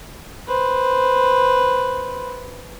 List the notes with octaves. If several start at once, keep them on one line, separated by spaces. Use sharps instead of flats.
B4 C5